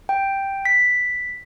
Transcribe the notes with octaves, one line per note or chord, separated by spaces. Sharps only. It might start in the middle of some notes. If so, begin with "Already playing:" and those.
G5
B6